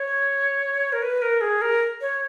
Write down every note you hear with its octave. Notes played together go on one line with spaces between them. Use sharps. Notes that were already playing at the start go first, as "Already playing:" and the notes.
Already playing: C#5
A#4
B4
A#4
G#4
A#4
C#5